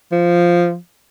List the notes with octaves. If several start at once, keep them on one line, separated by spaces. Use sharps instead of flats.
F3